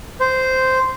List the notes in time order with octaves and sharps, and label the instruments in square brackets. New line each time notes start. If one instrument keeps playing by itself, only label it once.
[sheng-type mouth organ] C5